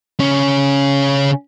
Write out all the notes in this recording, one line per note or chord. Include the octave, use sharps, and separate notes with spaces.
C#3 C#4